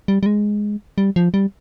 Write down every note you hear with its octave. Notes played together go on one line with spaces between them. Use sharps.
G3
G3
G#3
G3
F3
G3